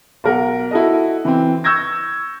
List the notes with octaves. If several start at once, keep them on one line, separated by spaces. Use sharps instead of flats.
B1 A#4 F#5
E4 F#4 A4 D#5
E3 C4
C#6 E6 G6 G#6 A#6